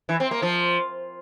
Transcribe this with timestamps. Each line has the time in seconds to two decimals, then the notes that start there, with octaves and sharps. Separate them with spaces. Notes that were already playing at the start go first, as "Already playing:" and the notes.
0.09 E3
0.20 C4
0.31 A#3
0.42 F3